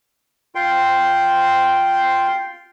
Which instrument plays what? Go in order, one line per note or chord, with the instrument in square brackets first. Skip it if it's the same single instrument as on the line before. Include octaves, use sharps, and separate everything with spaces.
[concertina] F4 G5 C6